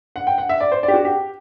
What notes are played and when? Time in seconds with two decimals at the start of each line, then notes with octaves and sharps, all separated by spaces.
0.16 F#5
0.27 G5
0.38 F#5
0.49 E5
0.60 D5
0.72 C5
0.83 D5
0.88 G4
0.94 F#4
1.05 G4